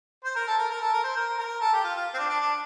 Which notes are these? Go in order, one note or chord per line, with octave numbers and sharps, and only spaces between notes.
C5
A#4
A4
A#4
A#4
A4
A#4
C5
A#4
A#4
A4
G4
F4
F4
C4
D4
D4
D4